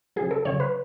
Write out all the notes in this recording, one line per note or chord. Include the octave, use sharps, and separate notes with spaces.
C#3 F#3 G#4
A4
C#3 F#3 C#5
B4